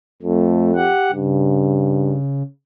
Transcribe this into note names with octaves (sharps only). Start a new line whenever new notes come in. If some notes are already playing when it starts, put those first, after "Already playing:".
F2 A3
G4 F#5
G2 C#3